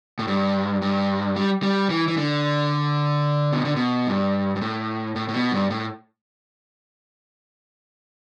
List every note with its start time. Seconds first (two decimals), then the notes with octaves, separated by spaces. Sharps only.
0.19 A2
0.28 G2
0.82 G2
1.36 G3
1.63 G3
1.90 E3
2.08 E3
2.17 D3
3.53 B2
3.65 D3
3.76 B2
4.07 G2
4.56 G2
4.62 A2
5.16 A2
5.28 A2
5.34 B2
5.52 G2
5.70 A2